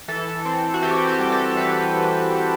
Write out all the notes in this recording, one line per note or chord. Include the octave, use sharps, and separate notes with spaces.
E3 A4
C4
F#4
E3 G4
G4
G3
A4
E3 B4